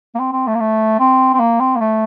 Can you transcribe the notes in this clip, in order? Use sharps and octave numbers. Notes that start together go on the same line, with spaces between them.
A#3
C4
C4
A3
A#3
A3
C4
C4
A#3
C4
A#3
A3